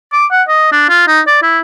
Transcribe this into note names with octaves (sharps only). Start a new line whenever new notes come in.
D6
F#5
D#5
D4
F4
D#4
D5
E4